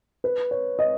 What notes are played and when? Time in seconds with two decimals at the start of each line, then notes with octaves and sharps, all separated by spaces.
0.24 B4
0.51 C#5
0.79 D#5